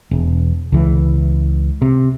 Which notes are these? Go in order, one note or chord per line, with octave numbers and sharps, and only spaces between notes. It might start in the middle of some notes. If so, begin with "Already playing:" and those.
E1
C#2 E3
C3